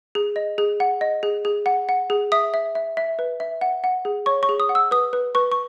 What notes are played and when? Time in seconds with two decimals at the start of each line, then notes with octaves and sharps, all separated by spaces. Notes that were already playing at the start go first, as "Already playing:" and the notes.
0.15 G#4
0.36 D#5
0.58 G#4
0.80 F#5
1.01 D#5
1.23 G#4
1.45 G#4
1.66 F#5
1.89 F#5
2.10 G#4
2.32 E5 D#6
2.54 E5
2.75 E5
2.97 E5
3.19 B4
3.40 E5
3.61 F#5
3.84 F#5
4.05 G#4
4.26 C#5 C#6
4.43 C#6
4.49 G#4
4.60 D#6
4.69 F#5
4.75 E6
4.91 B4 D#6
5.13 B4
5.35 B4 C#6
5.52 C#6